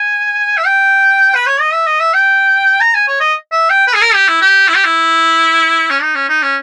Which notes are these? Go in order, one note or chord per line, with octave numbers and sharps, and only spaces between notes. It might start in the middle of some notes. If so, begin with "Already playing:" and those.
Already playing: G#5
E5
G5
B4
C#5
D#5
E5
D#5
E5
G5
A#5
G#5
C#5
D#5
E5
G5
B4
G#4
A#4
G4
E4
G4
E4
G4
E4
C#4
D#4
C#4
D#4
C#4